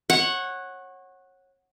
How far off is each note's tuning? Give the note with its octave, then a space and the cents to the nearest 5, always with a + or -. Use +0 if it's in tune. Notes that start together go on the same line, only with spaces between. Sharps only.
C#5 -25 F#5 +0